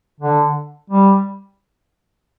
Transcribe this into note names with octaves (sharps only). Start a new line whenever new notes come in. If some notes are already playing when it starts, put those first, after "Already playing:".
D3
G3